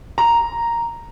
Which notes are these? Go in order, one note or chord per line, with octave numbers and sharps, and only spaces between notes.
A#5